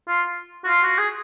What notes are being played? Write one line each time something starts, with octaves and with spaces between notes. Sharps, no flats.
F4
F#4
F4
F#4
G#4